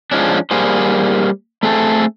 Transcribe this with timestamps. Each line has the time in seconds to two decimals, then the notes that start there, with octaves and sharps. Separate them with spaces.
0.11 F3 G#3 C#4 D4
0.51 G3 A#3 G#4 C5
1.63 A3 C4 G#4 A4